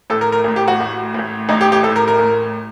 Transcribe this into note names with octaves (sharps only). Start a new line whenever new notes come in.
A1 A2 A4
A#4
A#4
A1 A2
G4
F#4
A1 A2
A1 A2
A1 A2 D#4
G4
G4
A1 A2 A4
A#4
A#4
A1 A2